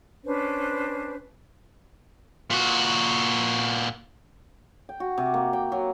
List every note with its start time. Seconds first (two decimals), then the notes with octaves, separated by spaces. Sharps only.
0.24 C#4 D4 B4 C5
2.51 A#2 F#4
4.89 G5
5.00 F#4
5.18 C3
5.34 A#3
5.53 G5
5.72 F#3